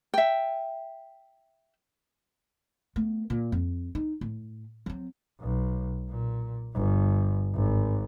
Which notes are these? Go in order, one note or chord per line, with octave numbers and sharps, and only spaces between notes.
E5 G5
A3 B3
A#2
F2
D#4
A2
F#3 C4
B1
A#2
G1
G#1